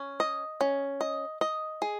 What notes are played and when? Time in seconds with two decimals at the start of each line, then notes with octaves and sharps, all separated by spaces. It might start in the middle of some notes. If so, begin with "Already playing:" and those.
Already playing: C#4
0.20 D#5
0.61 C#4
1.01 D#5
1.41 D#5
1.82 G#4